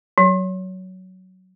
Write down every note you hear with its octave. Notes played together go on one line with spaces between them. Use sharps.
F#3